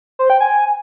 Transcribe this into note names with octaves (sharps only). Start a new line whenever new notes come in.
C5
G5
G#5